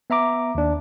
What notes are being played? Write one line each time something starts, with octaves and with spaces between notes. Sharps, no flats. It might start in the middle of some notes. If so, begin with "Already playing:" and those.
B3 E5 A#5 D6
D#2 D4